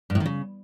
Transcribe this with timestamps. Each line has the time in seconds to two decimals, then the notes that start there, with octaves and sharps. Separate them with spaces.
0.10 G2
0.15 A2
0.20 D#3
0.26 C#3